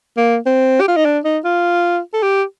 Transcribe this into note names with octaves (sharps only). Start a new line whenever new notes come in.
A#3
C4
G4
F4
D#4
D4
D#4
F4
A4
G4